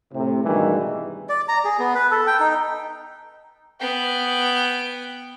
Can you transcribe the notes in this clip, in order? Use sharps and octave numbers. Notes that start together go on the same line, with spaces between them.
A2 C3
G2 B2 D#3 E3 G3 G#3
D5
A#5
G#4
B3
B4
A4
G5
D#4
B3 G5